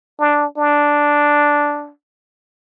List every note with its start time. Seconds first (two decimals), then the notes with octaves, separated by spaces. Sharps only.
0.19 D4
0.57 D4